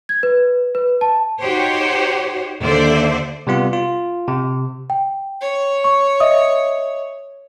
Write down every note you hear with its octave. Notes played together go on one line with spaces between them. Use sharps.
G#6
B4
B4
A5
D#4 F#4 G4 C5 C#5
D#2 D3 A4 C5 D5 E5
C3 G3 B3 F4
F4
C3
G5
C#5
C#6
D#5 E5 D#6